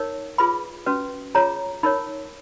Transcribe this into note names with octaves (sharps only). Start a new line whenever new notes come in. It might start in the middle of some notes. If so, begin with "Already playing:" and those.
Already playing: D#4 A#4 C#5
F4 G#4 B4 B5
C#4 F#4 B4
F4 G#4 C#5 A#5
D#4 A#4 C#5 B5